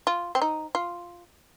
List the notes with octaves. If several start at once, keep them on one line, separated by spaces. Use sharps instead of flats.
F4
C4
D#4
F4